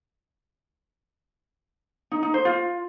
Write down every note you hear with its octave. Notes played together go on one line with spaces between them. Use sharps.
D#4
D#4
C5
F4